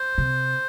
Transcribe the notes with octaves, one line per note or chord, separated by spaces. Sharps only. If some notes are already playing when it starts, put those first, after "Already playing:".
Already playing: C5
C3